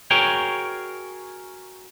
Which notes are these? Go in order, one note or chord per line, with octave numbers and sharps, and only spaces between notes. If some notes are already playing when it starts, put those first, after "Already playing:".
F#4 G#4 A#4 C#5 G5